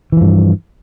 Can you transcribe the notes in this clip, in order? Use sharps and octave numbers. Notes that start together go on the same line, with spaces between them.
G2 E3 F3